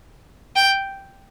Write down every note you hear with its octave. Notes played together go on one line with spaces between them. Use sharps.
G5